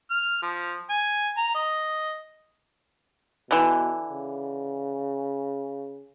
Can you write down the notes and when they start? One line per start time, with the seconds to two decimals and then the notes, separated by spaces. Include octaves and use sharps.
0.11 F6
0.43 F3
0.90 G#5
1.38 A#5
1.55 D#5
3.51 B2 D3 E3
4.10 C#3